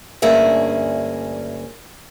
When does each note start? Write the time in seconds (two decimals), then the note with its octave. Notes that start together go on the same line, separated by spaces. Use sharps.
0.22 D2 G2 A#3 C#4 G#4 E5